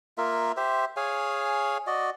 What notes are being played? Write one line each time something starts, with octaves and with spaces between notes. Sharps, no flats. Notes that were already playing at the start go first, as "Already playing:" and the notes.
A#3 F4 A#4 E5
G4 C5 E5
G#4 C#5 F5 G#5
F#4 D5 D#5